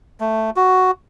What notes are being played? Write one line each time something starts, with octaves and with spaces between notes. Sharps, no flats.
A3
F#4